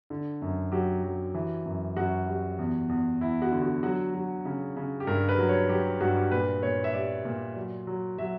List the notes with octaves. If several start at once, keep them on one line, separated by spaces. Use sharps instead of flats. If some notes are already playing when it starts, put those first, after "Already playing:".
D3
F#2
F#3 G4
F#3
E3
F#2
F#2 F#4
G3
E2
E2
E2 E4
F#4
D3
F#4
F#3 F#4
F#3
C#3
C#3
G4
G2 A#4
B4
F#3
C#5
F#3 G4
G2 F#4
G4
A#2 B4
A#2 C#5
E5
G3 D5
A#2
F#3
F#3
F#3 E5